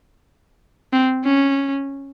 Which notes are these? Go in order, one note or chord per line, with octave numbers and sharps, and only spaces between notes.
C4
C#4